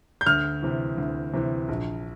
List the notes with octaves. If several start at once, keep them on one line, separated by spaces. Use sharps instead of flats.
G6
D2 F6
C3 E3
D2
C3 E3
A#1